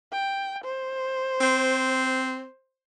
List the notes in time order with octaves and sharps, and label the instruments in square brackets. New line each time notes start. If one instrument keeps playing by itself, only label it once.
[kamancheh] G5
C5
[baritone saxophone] C4